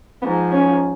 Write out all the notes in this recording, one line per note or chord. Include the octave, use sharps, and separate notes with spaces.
G#2 F3 B3
C#4